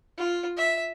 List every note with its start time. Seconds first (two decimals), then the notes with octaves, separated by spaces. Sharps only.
0.18 F4
0.57 E5